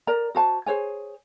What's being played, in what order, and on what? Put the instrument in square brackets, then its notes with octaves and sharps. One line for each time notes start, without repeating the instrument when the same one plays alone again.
[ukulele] A#4 D5 A#5
F#4 C5 A5
G#4 C5 C#5 G#5